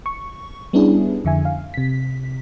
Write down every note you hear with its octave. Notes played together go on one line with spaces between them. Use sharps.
C#6
G3 B3 C#4 D4 E4 G#4
F2 D3 E5 G#5
F5
C3 B6